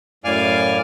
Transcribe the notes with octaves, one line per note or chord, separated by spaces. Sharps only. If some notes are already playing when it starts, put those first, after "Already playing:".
F#2 A2 D5 F5 G#5 F6